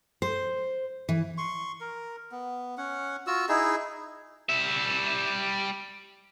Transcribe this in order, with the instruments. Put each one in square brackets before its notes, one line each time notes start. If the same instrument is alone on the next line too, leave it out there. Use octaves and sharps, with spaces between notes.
[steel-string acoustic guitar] C5
E3
[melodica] C6 C#6
A#4
B3
C#4 F#5
F4 F#4 E6
D#4 E4 G#4
[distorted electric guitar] G3 E5